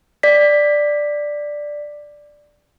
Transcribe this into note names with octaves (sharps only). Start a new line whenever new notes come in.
D5 B6